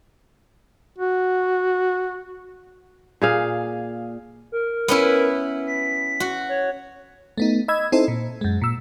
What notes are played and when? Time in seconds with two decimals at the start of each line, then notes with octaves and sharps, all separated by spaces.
0.98 F#4
3.22 A#2 G#4 F5
4.52 A#4
4.88 B3 C#4 E4
5.67 B6
6.20 F#4
6.49 C#5
7.38 A3 B3 D#4
7.68 D#5 B5 E6 G#6
7.92 C4 D#4 E4 A4 C5
8.08 A#2
8.41 F#2 G#3
8.62 A#2 E6